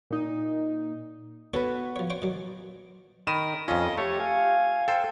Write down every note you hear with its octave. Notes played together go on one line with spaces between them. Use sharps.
A#2 D#4
B3 F#4 A4 B4 C#5
F3 C#5
C5 C#5 G5
A#2 D#3 F#3
D#3 A#4 B5 D#7 E7
F2 C#4 F4 D#5
A3 G4 C#5
F5 G#5
A4 C5 G5